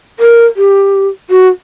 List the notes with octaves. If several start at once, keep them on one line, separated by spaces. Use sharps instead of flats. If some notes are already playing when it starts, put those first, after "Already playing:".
A#4
G4
F#4